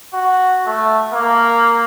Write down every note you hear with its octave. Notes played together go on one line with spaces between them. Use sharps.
F#4
A3
A#3